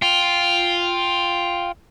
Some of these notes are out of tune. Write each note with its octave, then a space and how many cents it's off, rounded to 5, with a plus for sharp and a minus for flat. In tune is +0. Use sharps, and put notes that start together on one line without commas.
F4 +0 G5 +5